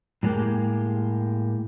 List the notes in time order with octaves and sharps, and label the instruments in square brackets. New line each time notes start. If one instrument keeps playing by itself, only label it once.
[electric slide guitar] A2 F#3 G#3 A#3 G4